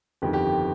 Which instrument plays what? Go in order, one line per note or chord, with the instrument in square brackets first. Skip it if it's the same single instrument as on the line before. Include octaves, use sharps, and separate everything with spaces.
[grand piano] G1 F2 D#3 G4
G4